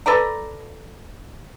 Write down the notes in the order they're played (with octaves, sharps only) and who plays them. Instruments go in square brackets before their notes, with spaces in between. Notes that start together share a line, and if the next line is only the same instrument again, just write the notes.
[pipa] A4 B4 D5 A#5